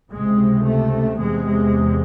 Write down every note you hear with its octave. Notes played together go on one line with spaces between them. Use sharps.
C#2 C3 G#3
A3
E2 C3 G#3